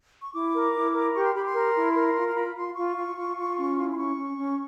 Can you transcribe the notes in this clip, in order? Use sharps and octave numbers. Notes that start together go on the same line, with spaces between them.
C#6
E4 D6
A#4
E4
A#4
G4 C#6
C6
G4 B5
C6
A#4
E4
A#4
F4
C6
F4 B5
F4 C6
F4 C#6
F4
F4
F4
C#4
E4
C6
C#4 C#6
C#4
C#4